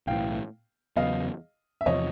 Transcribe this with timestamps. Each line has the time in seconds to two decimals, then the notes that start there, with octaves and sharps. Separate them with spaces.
0.07 B1 A2 E3 F5 G5
0.96 E2 C#3 F#3 B3 D#5 F5
1.81 E5
1.86 E2 C3 F3 C#5 D#5